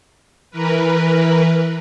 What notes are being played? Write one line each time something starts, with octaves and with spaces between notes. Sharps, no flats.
E3 A#4 B4